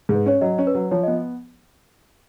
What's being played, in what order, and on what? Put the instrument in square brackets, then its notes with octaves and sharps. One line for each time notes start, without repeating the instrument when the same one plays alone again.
[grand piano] G#2
[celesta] B4
[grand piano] C#4 [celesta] C#5
[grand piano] F#3 [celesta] D#5
[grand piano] C#4 [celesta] C#5
[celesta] B4
[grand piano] F#3
[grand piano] F3 [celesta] C#5
[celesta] D#5
[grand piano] B3